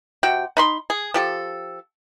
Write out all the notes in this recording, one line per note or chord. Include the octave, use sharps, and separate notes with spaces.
C3 F#4 G5
D#4 B5 C6
G#4
F3 G4 A4